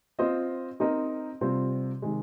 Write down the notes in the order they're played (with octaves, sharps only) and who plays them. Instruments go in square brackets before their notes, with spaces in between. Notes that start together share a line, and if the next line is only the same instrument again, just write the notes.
[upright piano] C4 F4 C5 D#5
C4 D#4 A#4 D#5
C3 G3 C4 F4 C5
C3 D#3 G#3